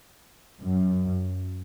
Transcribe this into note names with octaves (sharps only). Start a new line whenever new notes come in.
F#2